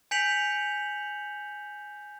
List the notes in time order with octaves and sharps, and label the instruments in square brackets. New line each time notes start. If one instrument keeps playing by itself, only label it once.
[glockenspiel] G#5 G6 B6 C#7 F7 F#7